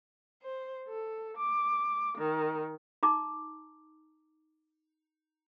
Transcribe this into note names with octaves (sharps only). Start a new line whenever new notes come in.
C5
A4
D6
D#3
D#4 A#5 D6